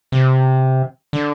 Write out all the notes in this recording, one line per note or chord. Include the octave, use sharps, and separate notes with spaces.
C3
D3